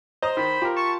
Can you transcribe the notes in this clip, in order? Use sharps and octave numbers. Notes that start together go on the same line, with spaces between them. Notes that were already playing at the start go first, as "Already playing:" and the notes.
C5 D#5 A#5 D#6
D#3 B5
F4 G4 A#4
A5 C#6